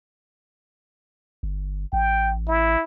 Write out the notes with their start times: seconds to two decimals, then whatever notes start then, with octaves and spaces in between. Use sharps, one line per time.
1.43 G1
1.93 A1 G5
2.48 E4